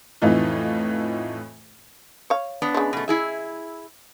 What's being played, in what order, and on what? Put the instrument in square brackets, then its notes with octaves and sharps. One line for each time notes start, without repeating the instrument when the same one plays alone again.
[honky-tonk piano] F2 A2 E3 D#4 F4
[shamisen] C#5 F5
[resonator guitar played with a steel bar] B3 D4
[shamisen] C#3 G#3
[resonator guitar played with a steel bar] B2 A3
E4 G#4 E5